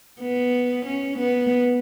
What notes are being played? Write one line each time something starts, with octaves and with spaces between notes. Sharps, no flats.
B3
C#4
B3